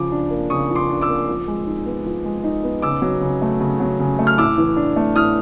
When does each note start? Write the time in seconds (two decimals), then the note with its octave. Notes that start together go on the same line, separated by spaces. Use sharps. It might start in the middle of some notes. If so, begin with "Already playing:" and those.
Already playing: C#3 F3 D6
0.12 D4
0.31 A#3
0.50 C#3 C#6 D#6
0.70 F3
0.75 C6 D6
0.89 D4
1.01 D6 E6
1.08 A#3
1.28 F3
1.47 G#3
1.67 D#4
1.86 B3
2.06 F3
2.25 G#3
2.44 D#4
2.63 B3
2.82 C#3 D6 E6
3.02 F#3
3.21 C#3
3.42 A3
3.60 C#3
3.80 F#3
4.00 C#3
4.19 A3
4.27 F6
4.38 A2 D6 E6
4.58 E3
4.76 D4
4.96 A3
5.16 A2 D#6 F6